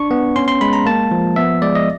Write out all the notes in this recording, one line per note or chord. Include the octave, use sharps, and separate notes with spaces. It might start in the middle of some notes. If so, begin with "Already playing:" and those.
Already playing: D4 C#6
B3
C#4 C6
C6
G#3 B5
A#5
A#3 A5
F3
B3 E5
G#3 D5
D#5